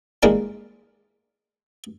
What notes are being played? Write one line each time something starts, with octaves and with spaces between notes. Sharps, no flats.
E3 G3 G#3 A#3 D4 F4